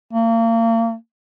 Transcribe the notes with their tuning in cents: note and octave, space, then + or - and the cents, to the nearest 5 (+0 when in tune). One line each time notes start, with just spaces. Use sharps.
A#3 -35